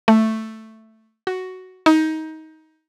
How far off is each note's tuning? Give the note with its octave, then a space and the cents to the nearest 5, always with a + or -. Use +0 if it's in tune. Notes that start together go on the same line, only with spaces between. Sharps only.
A3 +5
F#4 +5
D#4 +20